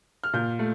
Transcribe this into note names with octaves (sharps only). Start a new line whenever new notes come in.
F6
A#2 G6
A3